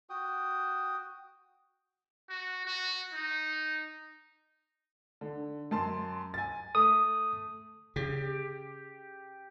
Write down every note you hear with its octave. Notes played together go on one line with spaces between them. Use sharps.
F#4 G5 D#6
F#4
F#4
D#4
D3
F#2 A5 C6
G#5 A6
A3 D#6
C#3 G4